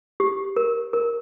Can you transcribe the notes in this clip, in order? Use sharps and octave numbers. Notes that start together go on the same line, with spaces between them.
G4
A#4
A#4